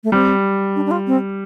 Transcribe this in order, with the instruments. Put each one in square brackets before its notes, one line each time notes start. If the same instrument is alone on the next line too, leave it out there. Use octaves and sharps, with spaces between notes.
[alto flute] A3
[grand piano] G3 [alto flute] C4
[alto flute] D4
D4
F4
C4